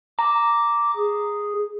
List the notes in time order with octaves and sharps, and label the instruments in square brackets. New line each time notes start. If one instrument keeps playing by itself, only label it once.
[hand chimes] A#5 [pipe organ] D6
[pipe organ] G#4